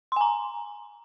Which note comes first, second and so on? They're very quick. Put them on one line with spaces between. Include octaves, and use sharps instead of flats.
C6 G#5 A#5